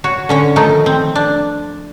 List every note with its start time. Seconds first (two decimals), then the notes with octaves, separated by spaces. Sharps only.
0.04 F#4 C#5
0.29 D3 C#4 C#5
0.56 D#3 F3 A3 D#4
0.86 C4
1.15 D4